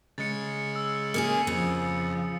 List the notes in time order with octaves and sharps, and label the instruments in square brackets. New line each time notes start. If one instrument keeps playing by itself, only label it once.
[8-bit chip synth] C#3 G#3 [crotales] A6 C#7
[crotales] E6
[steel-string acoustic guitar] A#3 C#4 G#4 [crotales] D#6 C#7
[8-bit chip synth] F2 [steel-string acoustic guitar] C#3 [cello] F3